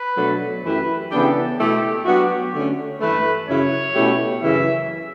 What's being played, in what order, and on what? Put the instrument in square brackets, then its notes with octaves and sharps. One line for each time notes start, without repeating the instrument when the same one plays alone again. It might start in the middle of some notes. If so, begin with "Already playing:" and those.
Already playing: [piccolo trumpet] B4
[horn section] B2 F#3 A3 D4 A4
[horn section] F#2 E3 A3 E4 G4 [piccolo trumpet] B4
[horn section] C#3 E3 B3 D4 G4 [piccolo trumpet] A4
[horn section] B2 A3 E4 A4 [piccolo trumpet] G4
[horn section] F#3 B3 D4 F#4 [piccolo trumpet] G4
[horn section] D3 A3 C#4
[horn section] G2 E3 A3 [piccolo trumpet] B4
[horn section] F#2 C#3 F#3 C#4 E4 [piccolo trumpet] C#5
[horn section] B2 A3 C#4 E4 G4
[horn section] F#2 C#3 E3 [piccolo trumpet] E5